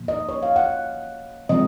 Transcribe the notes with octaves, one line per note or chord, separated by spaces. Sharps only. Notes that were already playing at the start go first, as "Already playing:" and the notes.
Already playing: A#2 F3 A#3
D#5
C#5
F5
F#5
C3 F3 G#3 C4 D#5